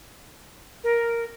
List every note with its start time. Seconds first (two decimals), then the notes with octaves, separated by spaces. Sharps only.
0.84 A#4